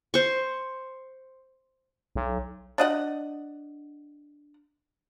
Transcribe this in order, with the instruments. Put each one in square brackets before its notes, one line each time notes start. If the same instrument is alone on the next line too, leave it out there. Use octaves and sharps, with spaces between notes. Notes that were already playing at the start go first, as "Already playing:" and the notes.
[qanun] C5 C#6
[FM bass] B1
[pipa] D4 D#5 F#5